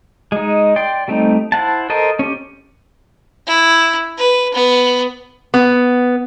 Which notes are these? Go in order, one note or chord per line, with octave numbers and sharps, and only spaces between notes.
G#3 D#4
D5 G5 C6
G3 A3 C4 D#4
E4 C5 F#5 A5
A4 A#4 C5 D#5
C#4 G4
E4
B4
B3
B3